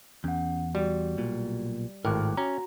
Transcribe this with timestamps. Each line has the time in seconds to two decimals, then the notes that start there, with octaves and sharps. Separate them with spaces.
0.24 E2 C#4 F#5
0.75 G3 F#4 G4
1.18 B1 A#2
2.05 G#1 A2 A#4 G5 D6 F#6
2.37 C#4 F#4 A#5